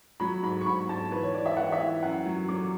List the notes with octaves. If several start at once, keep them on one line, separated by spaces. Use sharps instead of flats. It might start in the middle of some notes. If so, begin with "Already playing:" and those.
F#3 B5
G#2 B5
C#6
G#2 B5
G#2 A5
E3 B4
C#5
E3 D5
E5
E3 F#5
E5
E3
F#2 F#5
F#3
F#3 D6